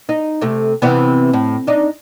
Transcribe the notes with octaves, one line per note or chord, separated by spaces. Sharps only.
D#4
C3 A3
C3 E3 B3
A2
D4 D#4